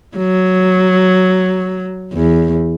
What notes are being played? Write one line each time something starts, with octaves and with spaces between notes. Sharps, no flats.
F#3
E2